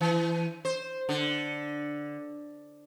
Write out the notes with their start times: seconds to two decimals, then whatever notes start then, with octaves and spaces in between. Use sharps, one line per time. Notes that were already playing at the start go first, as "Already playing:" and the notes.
0.01 E3
0.65 C5
1.09 D3